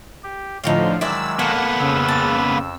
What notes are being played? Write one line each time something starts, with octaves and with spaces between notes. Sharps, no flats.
G4
A2 D3 F3 D#4 F#4 C#5 F5
D#3 F#3 G#3 E4 D5 E5 E6
A#3 B3 A4 F#5
F2 C#3 E6
A5